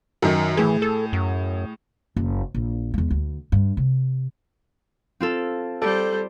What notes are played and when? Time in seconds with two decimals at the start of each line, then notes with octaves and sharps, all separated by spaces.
0.22 F#2 D#3
0.57 A2 E3 G#4
0.82 A4
1.13 F#2
2.16 F#1
2.54 A#1
2.94 E2 G#3
3.11 D2
3.52 G2
3.77 C3
5.20 C4 F4 A4
5.82 G3 A4 C5 D5